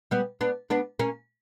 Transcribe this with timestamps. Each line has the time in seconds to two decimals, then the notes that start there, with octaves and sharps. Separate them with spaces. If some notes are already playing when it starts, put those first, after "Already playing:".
0.11 G3 B3
0.41 B3 D4
0.70 B3 D4
0.99 A#3 C#4